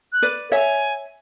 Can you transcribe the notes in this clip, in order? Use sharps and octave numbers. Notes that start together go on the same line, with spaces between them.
F#6
B4 D5
C#5 E5 G#5